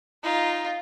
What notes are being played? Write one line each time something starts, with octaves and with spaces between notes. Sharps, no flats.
D#4 F4